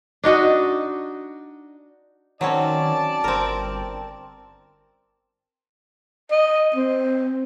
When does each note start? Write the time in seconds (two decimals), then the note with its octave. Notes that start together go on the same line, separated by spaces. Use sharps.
0.24 D4 D#4 F#4 D#5
2.41 D#3 F#3 C4 C#4 D5 A5
3.24 G1 C4 A#4
6.31 D#5
6.76 C4